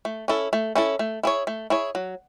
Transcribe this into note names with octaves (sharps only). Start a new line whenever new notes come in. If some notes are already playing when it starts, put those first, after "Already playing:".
A3
C#4 E4 A4
A3
C#4 E4 A4
A3
E4 G#4 C#5
A3
E4 G#4 C#5
F#3